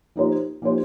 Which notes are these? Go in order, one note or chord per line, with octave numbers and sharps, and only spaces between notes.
F3 A#3 D#4 G4 C5
F3 A#3 D#4 G4 C5